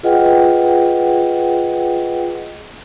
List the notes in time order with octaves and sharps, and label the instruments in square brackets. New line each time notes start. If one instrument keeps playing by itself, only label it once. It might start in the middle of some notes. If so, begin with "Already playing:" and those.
[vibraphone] F4 G#4 B4 D#5 F#5 G5